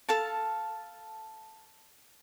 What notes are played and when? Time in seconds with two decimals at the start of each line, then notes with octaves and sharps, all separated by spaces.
0.09 A4 F5 A5